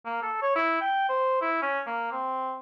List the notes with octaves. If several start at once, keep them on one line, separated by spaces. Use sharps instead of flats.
A#3
A4
C#5
E4
G5
C5
E4
C#4
A#3
C4